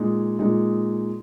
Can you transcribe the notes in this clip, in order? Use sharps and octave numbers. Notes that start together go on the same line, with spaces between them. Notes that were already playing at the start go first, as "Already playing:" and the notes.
Already playing: A#2 G#3 D#4
A#2 G#3 D#4